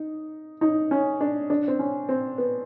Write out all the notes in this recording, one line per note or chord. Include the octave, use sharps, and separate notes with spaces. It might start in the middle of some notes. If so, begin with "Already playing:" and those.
Already playing: D#4
D#4
C#4
D4
D4
C4
C#4
C4
B3